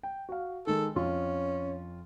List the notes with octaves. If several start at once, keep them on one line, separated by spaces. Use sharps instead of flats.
G5
F#4 F5
D#3 G#3 A4
F2 C#4 F4